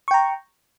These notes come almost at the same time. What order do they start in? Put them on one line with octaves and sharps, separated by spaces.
C#6 G5 A#5